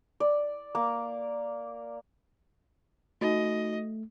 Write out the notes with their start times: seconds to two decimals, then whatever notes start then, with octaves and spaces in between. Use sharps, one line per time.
0.20 D5
0.75 A#3
3.21 A3 D#4 F#4 D#5